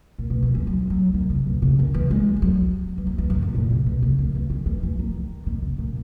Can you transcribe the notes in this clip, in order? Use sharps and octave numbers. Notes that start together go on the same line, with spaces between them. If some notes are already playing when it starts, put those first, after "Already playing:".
A#2
B2
D#3
E3
F#3
F#3
D#3
C#3
B2
C#3
D#3
E3
G#3
G#3
F#3
E3
F#3
E3
F#2
F#2
A#2
C#3
B2
C#3
D#3
E3
D#3
E3
E3
D#3
D#3
C#3
A#2